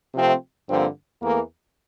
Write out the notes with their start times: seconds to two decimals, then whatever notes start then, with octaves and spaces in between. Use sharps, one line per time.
0.14 C3 F3 A3 C4
0.69 G2 D3 F3 A#3 C4
1.21 E2 E3 A3 A#3